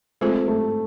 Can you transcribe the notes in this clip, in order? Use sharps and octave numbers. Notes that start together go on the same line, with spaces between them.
G#3 A3 C4 F4 G#4 C5
A3